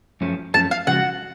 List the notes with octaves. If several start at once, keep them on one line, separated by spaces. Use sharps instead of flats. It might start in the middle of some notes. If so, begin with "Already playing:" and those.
F#2 F3 A3 C#4
F#2 F3 A3 C#4 A5
F5
C#3 F3 G#3 D4 F#4 F#5